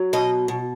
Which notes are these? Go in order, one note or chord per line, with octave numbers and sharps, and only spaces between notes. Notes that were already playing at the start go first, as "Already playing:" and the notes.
Already playing: F#3
B2 D#5
B2